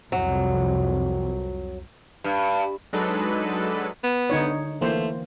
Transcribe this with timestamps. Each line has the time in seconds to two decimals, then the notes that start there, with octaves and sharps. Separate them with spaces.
0.12 C2 F2 F#3
2.24 G2
2.93 F#3 G#3 D4 D#4 A4 B4
4.04 B3
4.30 D3 D#4 C#5
4.81 E3 A3 A#3 C5